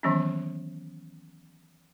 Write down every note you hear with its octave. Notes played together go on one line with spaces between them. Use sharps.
D#3 E3 F#3 A#3 B3 C#4